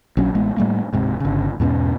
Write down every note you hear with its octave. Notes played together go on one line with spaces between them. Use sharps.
A#1 F#3 C#4
A1 G#3 B3
A2 G3 A3 A#3
D1 G#2 C3
G1 C#3
E2 G#2 B2 C#4